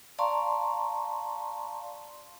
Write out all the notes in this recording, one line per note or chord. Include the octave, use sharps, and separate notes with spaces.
D5 F5 A5 A#5 C6 C#6